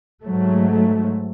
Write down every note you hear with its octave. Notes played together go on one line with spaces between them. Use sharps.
G#2 F#3 A3